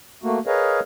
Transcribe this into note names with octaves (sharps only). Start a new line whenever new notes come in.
A3 A#3 F#4
G#4 A#4 B4 C#5 D#5 F5